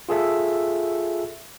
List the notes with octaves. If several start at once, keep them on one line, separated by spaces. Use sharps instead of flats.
F4 G#4 A4 E5